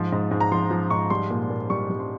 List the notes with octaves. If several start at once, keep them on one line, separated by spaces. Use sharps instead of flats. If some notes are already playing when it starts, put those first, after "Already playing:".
Already playing: G#2 F3
G#2
G#2
A#5
F3 C6
F3
G#2 C#6
G3 C6
A#2
A#2
G3 C#6
G3
C6